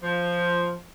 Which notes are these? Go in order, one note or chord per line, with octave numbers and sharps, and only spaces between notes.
F3